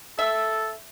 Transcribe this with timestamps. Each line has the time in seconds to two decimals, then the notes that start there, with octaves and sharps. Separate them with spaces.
0.19 A4 E5